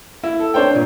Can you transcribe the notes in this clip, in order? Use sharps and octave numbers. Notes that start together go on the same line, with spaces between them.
E4
A4
C4 D4 C5 C#5 G5
G2 A#2